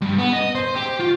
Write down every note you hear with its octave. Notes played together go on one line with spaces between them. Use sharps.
G2
B3
D#5
C5
G4
F4